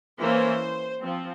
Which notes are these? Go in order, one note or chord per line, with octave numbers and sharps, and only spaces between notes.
E3 A#3 C#4 C5
F3 C4